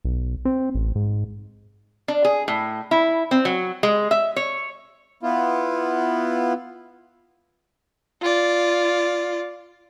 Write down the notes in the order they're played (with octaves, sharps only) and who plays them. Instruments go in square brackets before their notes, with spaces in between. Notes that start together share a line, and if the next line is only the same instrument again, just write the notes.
[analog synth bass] B1
C4
A1
G#2
[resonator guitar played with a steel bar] D4
G#4
A2
E4
C4
F#3
G#3
E5
C#5
[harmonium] B3 E4 F4
[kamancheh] F4 D5